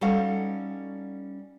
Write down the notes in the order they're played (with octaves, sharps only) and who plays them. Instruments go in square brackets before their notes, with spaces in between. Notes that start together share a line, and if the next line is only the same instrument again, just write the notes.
[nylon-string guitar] G3 C#4 D#4 F#4 A4 F5